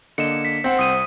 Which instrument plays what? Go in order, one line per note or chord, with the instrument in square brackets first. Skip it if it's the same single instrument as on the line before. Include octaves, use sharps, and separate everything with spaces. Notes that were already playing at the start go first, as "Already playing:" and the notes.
[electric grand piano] D3 A#3 D#5 [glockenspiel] C#7 E7
[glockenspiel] B6
[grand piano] C4 F#5
[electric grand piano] C2 [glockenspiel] D#6 D#7